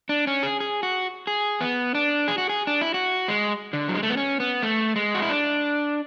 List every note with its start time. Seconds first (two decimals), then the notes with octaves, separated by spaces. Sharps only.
0.09 D4
0.27 C#4
0.43 G#4
0.60 G#4
0.83 F#4
1.27 G#4
1.61 B3
1.95 D4
2.28 G#4
2.38 F#4
2.49 G#4
2.67 D4
2.81 E4
2.94 F#4
3.28 G#3
3.73 D3
3.88 F#3
3.95 G#3
4.03 A3
4.10 B3
4.17 C#4
4.40 B3
4.63 A3
4.96 G#3
5.15 F#4
5.22 E4
5.30 D4